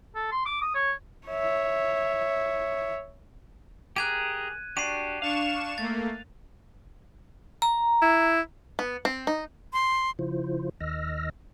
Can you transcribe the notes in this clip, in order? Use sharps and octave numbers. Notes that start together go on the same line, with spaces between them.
A4
C6
D6
D#6
C#5
C#5 E5
G4 G#4 A#4 F#6 G#6 D#7
D4 F#4 G4 C7 D#7
D4 F5 C#6 E7
A3 A#3 A6
A#5
E4
B3
C4
D#4
C6
C#3 F3 E4 F4 C5
D#2 D#3 D#5 E6 F6 A#6